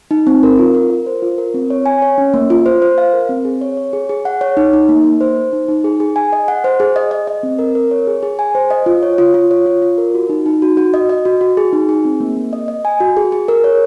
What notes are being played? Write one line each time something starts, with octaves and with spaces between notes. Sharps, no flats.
D#4
C4
A#4
F4
A#4
A#4
C5
F4
A#4
C4
C#5
G#5
C#5
C#4
A#3
F4
C5
C5
F5
A#4
C4
G#4
C#5
C#5
G#4
G#4
F#5
C#5
D#4
D#4
A#3
A#3
C5
C5
D#4
D#4
G#4
G#4
G#5
D#5
F#5
C5
G#4
D#5
D#5
D#5
C4
A#4
A#4
C#5
G#4
G#4
G#5
C5
D#5
F4
C#5
F4
F4
C#5
F4
F4
A#4
F#4
D#4
D#4
F#4
F#4
D#5
D#5
F#4
F#4
G#4
D#4
G#4
C4
A#3
A#3
D#5
D#5
G#5
F#4
G#4
G#4
A#4
C#5